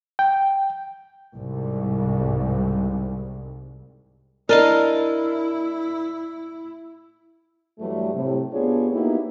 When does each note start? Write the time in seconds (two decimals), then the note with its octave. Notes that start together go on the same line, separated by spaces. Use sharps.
0.19 G5
1.35 C2 G#2
4.49 D4 E4 A#4 D#5 F5
7.79 G2 E3 F#3 G3 A3
8.14 A2 C3
8.52 B3 D4 F4 G4 G#4 C#5
8.92 A#3 B3 D#4 E4 F#4 G4